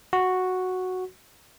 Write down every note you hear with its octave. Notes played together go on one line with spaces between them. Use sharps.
F#4